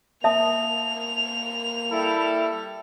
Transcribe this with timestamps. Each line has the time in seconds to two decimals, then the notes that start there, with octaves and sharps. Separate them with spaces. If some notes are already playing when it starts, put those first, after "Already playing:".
0.24 A#3 E5 A5 D#6 F7
1.92 G3 E4 A4